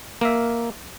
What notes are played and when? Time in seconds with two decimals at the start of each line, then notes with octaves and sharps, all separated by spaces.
0.21 A#3 A#4 E5